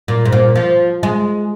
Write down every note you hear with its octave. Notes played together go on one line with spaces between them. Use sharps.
A#2
G#2
A#2
F3
G#3